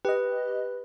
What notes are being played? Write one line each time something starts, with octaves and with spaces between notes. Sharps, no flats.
G4 B4 D#5